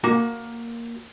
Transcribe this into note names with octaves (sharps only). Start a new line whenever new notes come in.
A#3 F#4 A#5